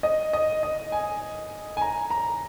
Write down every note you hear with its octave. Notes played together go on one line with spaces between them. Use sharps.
D#5
D#5
D#5
G#5
G#5
A#5
A#5